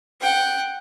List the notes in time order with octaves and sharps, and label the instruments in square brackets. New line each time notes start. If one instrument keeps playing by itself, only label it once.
[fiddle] F#5 G5